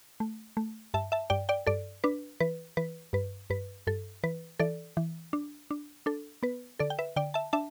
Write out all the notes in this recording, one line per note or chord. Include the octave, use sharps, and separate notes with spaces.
A3
A3
G2 E5 A5
E5 A5
G2 D5 G5
D5 G5
G2 A4 D5
D4 B4
E3 B4
E3 B4
G2 B4
G2 B4
G2 A4
E3 B4
E3 A4 D5
E3
D4
D4
D4 A4
B3 B4
D3 A4 D5
G5
B4 E5
D3 D5 G5
E5 A5
D4 E5 A5